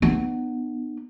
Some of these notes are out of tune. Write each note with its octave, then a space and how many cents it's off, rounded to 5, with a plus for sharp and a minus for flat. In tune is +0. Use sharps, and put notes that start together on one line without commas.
B3 +5 D#4 -45